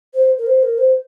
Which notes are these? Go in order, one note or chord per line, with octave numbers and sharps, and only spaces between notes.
C5
A#4
C5
A#4
C5